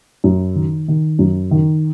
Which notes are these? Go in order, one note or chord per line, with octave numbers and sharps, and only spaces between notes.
F#2
D#3
D#3
F#2
D#3